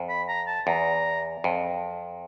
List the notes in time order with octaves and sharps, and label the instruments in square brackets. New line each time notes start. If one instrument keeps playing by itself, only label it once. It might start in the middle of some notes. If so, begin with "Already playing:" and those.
Already playing: [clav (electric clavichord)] F2
[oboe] B5
A#5
A5
[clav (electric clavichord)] E2 [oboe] A#5
[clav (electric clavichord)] F2